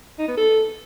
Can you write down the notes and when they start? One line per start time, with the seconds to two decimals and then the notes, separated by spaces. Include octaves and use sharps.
0.19 D#4
0.28 B3
0.38 A4